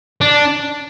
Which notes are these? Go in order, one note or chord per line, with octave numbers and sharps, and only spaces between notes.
D4